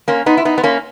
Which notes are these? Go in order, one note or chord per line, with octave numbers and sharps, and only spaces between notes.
A#3 C#4
B3 D#4
E4
B3 D#4
B3
A#3 C#4